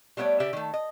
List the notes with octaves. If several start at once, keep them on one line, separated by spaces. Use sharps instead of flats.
G3 A3 B3 C#5 D5
C#3 G4 D5 E5
D#3 A3
D#5